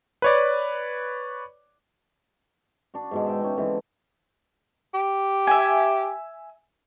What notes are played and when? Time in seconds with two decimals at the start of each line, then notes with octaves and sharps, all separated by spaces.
0.22 B4 C#5 D5
2.94 D4 F#4
3.11 G#2 B2 G#3
3.27 E5 G5
3.41 C#4 D#4
3.56 D3 E3 G#3 C4
4.94 G4
5.47 E5 G#5